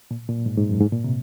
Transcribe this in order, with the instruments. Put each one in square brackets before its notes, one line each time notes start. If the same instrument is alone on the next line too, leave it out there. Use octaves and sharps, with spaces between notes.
[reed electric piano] A#2
A#2
G#2
G#2
F#2
G#2
A#2
C3